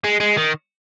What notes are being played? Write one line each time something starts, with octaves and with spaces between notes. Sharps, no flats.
G#3
G#3
D#3